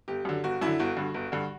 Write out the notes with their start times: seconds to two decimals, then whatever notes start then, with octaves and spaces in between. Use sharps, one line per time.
0.08 G1 G4
0.25 F#2 D3
0.44 G1 F#4
0.62 F#2 D3 E4
0.79 G1 F#4
0.97 G2 D3
1.14 G1
1.32 G2 D3